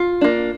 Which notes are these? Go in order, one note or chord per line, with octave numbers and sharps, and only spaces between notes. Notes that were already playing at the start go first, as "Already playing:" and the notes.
Already playing: F4
A#3 D4